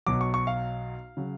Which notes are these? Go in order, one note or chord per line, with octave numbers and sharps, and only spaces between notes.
B1 B2 F#3 D6
C#6
C#6
F5
C#3 F#3